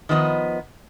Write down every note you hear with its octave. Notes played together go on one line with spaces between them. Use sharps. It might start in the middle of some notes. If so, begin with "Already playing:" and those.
D#3 F3 B3 D#5